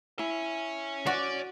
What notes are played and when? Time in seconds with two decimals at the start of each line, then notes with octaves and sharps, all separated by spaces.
0.19 E4 C#5 G#5
1.07 F#4 D5